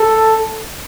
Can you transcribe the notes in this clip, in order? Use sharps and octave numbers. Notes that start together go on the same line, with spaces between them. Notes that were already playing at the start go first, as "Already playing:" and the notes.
Already playing: A4